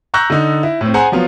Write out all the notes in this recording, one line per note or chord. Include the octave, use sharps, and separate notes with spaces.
A#5 C#6 E6 F#6 G6 A#6
D3 D#4
E4
A2 C4
G#4 C5 F#5 G#5 A#5
F3 F#3 B3 F4